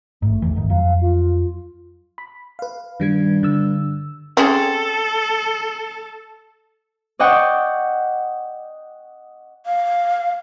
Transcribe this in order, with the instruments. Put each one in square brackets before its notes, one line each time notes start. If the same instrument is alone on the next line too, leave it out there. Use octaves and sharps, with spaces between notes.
[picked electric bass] A1 G#2 [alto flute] A3
[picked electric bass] A#1 E2 E3
G1 G#2 D#3
[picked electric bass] F2 F#3 [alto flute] F5
[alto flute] F4
[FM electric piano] B5
B4 F5
[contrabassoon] G2 [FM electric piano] D#3 G3 G#6
[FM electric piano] D3 E6
[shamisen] C4 C#4 G#4 [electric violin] A4
[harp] D5 D#5 F#5 G5 C#6
[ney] F5